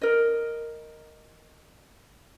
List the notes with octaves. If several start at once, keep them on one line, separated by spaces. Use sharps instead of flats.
A#4 D#5